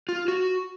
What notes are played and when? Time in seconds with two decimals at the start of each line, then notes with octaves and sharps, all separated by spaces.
0.09 F4
0.28 F#4